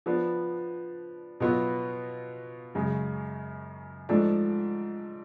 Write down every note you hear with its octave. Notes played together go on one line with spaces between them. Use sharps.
F3 B3 D4
B2 F#3 B3 F4
F#2 C#3 G#3
G#2 F3 A3 D4